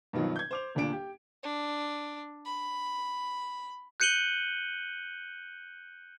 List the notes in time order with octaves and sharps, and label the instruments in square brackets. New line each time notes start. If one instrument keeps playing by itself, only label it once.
[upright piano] G2 B2 D#3 F3 F#3
G6 G#6
C5 D6 F7
D#1 D2 A#2 D4 D7
G4
[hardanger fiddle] D4
B5
[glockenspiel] F#6 G6 C#7 D#7 F#7 G7